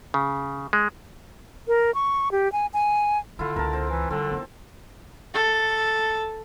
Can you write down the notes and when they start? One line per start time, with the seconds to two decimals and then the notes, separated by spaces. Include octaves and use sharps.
0.14 C#3
0.73 G#3
1.68 A#4
1.94 C#6
2.32 G4
2.52 G#5
2.73 G#5
3.39 D3 D#3 E4 F4
3.56 C#2 D4 A#4 A5
3.73 C4
3.90 E3
4.11 D3 G3 C4
4.31 B3 D4
5.34 A4